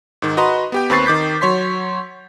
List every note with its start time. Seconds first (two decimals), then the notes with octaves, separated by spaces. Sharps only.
0.22 G#2 D#3
0.37 F#4 B4 D#5 A#5 C6
0.72 B3 G4 G5
0.90 D#2 C4 B4 C#6 A6 C7
1.06 D#3 D6 G6 B6
1.41 F#3 C#5 C6 B6